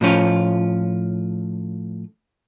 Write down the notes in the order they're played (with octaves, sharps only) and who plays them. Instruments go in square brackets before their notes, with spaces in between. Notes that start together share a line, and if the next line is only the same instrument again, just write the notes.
[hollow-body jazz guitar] A2 F3 C#4 F4